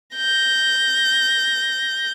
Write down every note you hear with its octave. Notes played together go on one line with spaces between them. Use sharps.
G6 A#6